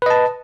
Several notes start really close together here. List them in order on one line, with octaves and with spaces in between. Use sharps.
B4 D#5 A5